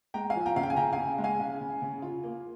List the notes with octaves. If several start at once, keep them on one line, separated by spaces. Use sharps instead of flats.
G#3 G5 A#5
F5 G#5
F3
G5 A#5
C#3 F5
G5
G#5
C#3 G5 A#5
F5 G#5
C#3
G#3
F5 G#5
C#3
C#3
C#3
F4
A#3